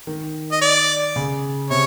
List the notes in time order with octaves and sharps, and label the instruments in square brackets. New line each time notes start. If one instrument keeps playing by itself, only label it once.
[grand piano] D#3
[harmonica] D#5
D5
[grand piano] C#3
[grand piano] C3 [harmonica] C#5